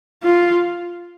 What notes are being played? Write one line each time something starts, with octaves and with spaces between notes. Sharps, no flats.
F4